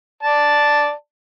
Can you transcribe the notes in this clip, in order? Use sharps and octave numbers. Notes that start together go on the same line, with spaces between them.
D5 A5